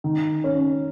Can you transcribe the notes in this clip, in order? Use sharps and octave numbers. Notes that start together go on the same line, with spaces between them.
D#3
C#4